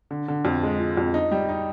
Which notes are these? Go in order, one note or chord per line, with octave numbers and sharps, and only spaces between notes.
D3
D3
F2
G#3
F3
F2
D#4
G3
D#4